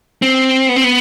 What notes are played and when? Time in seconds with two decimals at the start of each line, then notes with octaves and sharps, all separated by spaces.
0.22 C4
0.69 B3
0.76 C4
0.84 B3